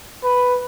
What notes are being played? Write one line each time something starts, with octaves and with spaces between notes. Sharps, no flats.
B4